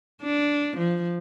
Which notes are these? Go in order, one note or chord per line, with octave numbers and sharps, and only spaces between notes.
D4
F3